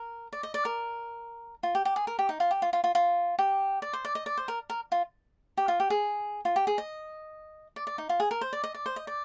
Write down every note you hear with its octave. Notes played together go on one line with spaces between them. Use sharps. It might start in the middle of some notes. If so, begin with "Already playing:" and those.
Already playing: A#4
D5
D#5
D5
A#4
F4
G4
G4
G#4
A#4
G4
D#4
F4
G4
F4
F4
F4
F4
G4
D5
C5
D5
D#5
D5
C5
A#4
A#4
F4
G4
F4
G4
G#4
F4
G4
G#4
D#5
D5
D5
D#4
F4
G#4
A#4
C5
D5
D#5
D5
C5
D#5
D5